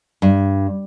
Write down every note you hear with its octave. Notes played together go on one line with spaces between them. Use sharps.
G2